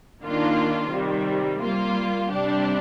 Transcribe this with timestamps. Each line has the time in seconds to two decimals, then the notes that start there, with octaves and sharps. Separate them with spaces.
0.23 D#3 A#3 D4 F4
0.92 C3 D#3 G3
1.61 G3 A#3 F4
2.30 C3 G3 D4 G4